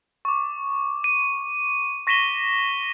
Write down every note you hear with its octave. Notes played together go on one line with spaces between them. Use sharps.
C#6 D6
D#7
C#6 A#6 B6 D#7 E7 G7